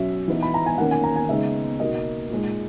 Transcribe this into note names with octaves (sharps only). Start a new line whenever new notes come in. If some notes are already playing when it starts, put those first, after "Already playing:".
Already playing: B2 F#3 C#4 E5
E3 B3 D#4
B5
A#5
G#5
D#3 A#3 C#4 F#5
G#5
A#5
G#5
C#3 G#3 B3 D#4 E5
B2 A#3 D#4 D#5
A#2 G#3 D#4